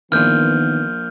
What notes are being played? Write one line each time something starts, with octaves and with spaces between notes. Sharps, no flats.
A#1 A#2 D#3 E3 B3 F6 G6